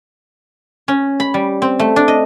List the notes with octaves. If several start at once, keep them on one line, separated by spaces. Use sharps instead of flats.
C#4
B5
G3
C4
A3
D4
D#5